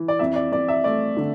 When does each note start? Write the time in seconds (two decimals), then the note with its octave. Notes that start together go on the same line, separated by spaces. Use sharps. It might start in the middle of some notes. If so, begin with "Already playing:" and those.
Already playing: E3
0.08 D5
0.19 F2 E5
0.35 D5
0.52 F2 D5
0.68 E5
0.84 A3 D5
1.17 D3